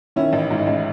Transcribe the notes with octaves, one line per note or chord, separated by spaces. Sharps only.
D#3 C#4 E4
A1
G#2
A1